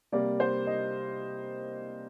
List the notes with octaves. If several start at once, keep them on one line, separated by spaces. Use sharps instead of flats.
C3 G3 A#3 D5
C5
D#5